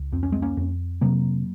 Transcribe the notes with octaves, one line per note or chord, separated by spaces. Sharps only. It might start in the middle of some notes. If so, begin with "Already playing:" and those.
Already playing: C#2
F2 C4
C#4
G#3 C4
A#3 C#4
F2
C3 F#3 A#3